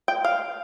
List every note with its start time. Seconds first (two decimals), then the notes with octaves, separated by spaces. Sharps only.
0.08 G5
0.25 F5